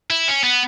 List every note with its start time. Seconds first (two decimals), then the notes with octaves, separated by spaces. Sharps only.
0.10 E4
0.28 C#4
0.44 B3